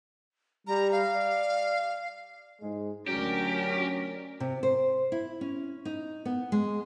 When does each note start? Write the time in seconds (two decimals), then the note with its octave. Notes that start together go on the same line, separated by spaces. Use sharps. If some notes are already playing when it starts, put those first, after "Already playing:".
0.67 G3 A#5
0.92 F5
1.13 D5
2.62 G#2 G#3
3.08 D2 F#3 C#4 F#4 G4 A#4 D5
4.40 C3
4.63 C5
5.12 E4
5.41 C#4
5.85 D#4
6.25 B3
6.52 G#3